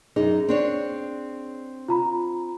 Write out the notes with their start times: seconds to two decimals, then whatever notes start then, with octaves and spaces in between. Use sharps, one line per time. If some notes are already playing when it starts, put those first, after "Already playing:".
0.16 F#2 D#4 G#4
0.49 C4 D4 C#5
1.88 F4 A#5 B5